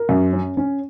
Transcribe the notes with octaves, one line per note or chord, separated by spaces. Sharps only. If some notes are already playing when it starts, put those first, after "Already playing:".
Already playing: A#4
F#2
C#4
C#4